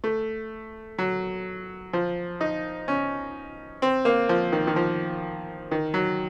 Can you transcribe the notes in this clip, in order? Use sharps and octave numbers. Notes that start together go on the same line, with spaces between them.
A3
F#3
F3
D#4
C#4
C4
A#3
F3
D#3
D#3
F3
D#3
F#3